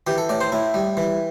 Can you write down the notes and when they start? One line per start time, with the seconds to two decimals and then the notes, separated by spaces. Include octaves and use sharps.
0.07 E3 G4
0.18 A4
0.29 A2 D5
0.41 C5
0.52 A2 E4
0.74 G3
0.97 E3